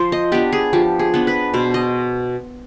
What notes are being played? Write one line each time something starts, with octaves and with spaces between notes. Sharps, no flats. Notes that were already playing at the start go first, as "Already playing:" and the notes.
Already playing: F3 C5
D#5
B3 D4 G4
G#4
F3 G4
G#4
B3 D4
B4
B2 C5
D#5